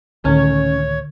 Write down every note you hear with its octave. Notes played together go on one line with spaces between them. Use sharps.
C#2 A2 D3 D#3 C#4 C#5